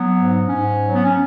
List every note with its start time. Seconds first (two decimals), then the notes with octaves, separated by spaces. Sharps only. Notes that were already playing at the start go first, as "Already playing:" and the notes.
Already playing: F#3 B3
0.16 G#2
0.49 G#2 C#4
0.82 F#3
0.93 B3
1.04 C#4